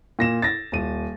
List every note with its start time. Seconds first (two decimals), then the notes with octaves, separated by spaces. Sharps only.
0.19 A#2 A#6 E7
0.42 A6 A#6
0.72 D#1 D#7